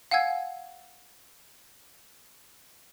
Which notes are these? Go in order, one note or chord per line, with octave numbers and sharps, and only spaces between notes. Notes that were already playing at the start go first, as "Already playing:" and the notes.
F5 F#5 G#5 E6 G#6